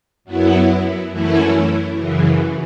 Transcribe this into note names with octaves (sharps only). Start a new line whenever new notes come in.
F#2 F#3 B3 E4
F#2 E3 A3 C#4 E4
F#2 C#3 E3